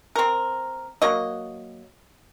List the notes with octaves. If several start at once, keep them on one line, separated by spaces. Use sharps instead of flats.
C4 A#4
F#3 A#3 D#5